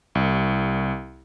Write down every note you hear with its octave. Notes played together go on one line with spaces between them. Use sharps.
C2